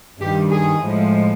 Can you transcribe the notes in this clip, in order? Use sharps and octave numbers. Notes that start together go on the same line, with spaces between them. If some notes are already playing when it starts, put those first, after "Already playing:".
G2 D#3 G3 G4
G#4
A2 F3 G#3